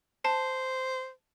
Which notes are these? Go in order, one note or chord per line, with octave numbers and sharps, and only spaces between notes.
C5 A5